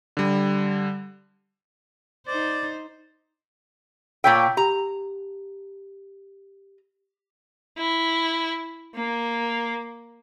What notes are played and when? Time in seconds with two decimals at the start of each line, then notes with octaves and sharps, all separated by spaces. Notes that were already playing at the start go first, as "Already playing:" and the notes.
0.17 D3 G3
2.27 D#4 C5 D5
4.24 A#2 C#5 G5 E6 G6 B6
4.57 G4 A#5
7.78 E4
8.95 A#3